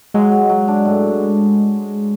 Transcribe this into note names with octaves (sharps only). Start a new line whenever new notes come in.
F#3 G#3
F#3
F#3
D4
A2